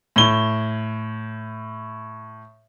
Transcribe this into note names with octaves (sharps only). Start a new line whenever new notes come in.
A2 G7